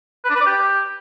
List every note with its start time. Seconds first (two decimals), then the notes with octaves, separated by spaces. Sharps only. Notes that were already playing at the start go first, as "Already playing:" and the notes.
0.24 B4
0.30 D4
0.35 B4
0.41 D5
0.46 G4